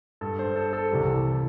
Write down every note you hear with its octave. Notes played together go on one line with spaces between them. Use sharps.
G2 G3 A4
C5
A4
A4
C2 C3 E3 G3